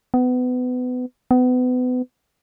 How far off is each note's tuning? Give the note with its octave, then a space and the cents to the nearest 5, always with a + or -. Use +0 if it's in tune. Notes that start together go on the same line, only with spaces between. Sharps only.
B3 +25
B3 +30